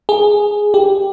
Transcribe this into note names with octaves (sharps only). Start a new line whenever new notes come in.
G#4
G4